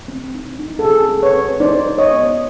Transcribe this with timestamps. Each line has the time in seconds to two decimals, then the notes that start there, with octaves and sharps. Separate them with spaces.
0.08 C4
0.34 D#4
0.59 D#4
0.79 A4
0.85 C4 G#4
1.10 C4
1.23 B4 C#5
1.35 C4
1.60 D#4 C5 D5
1.86 D#4
1.98 C#5 D#5
2.11 B3